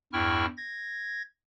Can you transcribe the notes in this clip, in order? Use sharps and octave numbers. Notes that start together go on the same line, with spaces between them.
E2 G2 E4 G5 C#6 F6
G#6 A#6